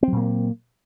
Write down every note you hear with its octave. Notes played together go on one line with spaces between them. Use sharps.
A#2 F#3 A#3 C4